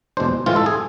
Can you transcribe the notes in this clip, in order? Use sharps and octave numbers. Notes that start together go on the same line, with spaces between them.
E2 B2 G#3 D4 C5
A2 E3 G#3 C4 F4
A4
G#4